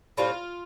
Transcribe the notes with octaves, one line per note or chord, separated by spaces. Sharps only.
A2 G3 C4 F4